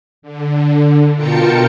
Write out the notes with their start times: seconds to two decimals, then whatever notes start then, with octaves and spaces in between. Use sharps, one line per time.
0.22 D3
1.15 B2 F4 A#4 G5 A5 C#7